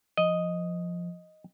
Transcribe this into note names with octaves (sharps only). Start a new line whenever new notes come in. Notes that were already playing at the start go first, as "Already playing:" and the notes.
F3 D#5